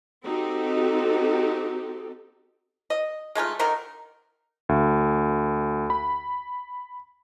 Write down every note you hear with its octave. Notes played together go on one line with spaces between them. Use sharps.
C4 D#4 F#4 G4 A4
D#5
G#3 A3 D#4 F4
D3 D#3 D#4 A#4
D2
B5